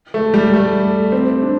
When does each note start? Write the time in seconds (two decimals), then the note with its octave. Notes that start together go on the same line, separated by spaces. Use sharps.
0.14 A3
0.34 G3
0.53 A3
1.12 C4
1.43 D4